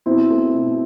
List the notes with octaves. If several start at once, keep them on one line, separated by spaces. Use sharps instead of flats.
B2 C4 E4
A3
B2